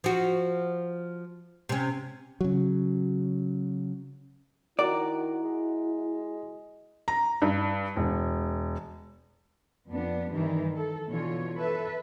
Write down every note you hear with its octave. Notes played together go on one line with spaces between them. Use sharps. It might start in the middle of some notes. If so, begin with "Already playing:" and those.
F3 F#4
C3 C#4
C#3 F#3
D#3 E4 F#4 D5 F#5 A#5
G#3
A#5
G2
E1
F2 B3 D4
G2 D#3 E3 G3
A4
B2 D3 E3 F4 C#5
A4 B4 E5